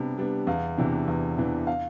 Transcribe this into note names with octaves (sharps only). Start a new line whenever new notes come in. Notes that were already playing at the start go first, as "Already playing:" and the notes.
Already playing: C3 G3 B3 D4
G3 B3 D4
E2 F5
C3 E3 B3 D4
E2
C3 E3 B3 D4
F5